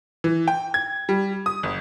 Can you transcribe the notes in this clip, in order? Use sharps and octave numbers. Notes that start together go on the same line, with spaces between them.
E3
G5
G#6
G3
D#6
F#1